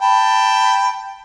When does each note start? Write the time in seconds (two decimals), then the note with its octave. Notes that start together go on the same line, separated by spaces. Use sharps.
0.01 G5 A5 B5